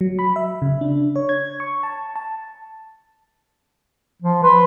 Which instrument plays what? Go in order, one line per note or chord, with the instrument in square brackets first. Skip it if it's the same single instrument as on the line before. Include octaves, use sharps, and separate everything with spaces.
[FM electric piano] F#3
B5
E5
C#3
D4
C#5
G#6
C#6
A5
A5
[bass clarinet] F3
[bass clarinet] B4 [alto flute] C6